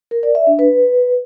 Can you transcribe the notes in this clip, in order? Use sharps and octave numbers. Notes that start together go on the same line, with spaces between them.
A#4
D5
E5
D4
B4